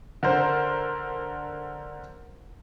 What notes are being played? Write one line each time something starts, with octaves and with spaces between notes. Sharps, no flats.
D3 A#4 C5